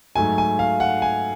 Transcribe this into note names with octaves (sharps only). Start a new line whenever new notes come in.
G#2 F#3 A3 G#5
G#5
F5
F#5
G#5